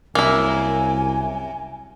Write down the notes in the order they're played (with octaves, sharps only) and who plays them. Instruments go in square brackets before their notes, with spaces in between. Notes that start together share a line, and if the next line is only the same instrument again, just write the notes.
[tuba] C2 [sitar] F#2 [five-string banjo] A#3 E4 [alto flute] G#5